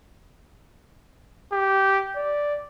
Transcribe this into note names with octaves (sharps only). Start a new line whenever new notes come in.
G4
D5